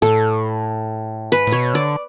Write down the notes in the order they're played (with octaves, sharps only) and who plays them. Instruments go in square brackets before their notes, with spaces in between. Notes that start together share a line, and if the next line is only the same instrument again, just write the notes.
[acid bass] A2 [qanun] A4
[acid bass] G#2 [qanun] B4
[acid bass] A2
[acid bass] B2 [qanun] C#5
[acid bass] D3 [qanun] D5